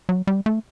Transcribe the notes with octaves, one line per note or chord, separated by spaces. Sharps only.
F#3
G3
A3